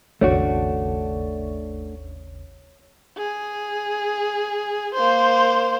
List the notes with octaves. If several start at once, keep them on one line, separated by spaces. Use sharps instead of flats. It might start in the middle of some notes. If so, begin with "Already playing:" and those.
G#1 D#2 C#3 A3 D4 F#4 C#5
G#4
A#3 C5